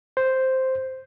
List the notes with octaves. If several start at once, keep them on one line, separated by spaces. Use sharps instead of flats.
C5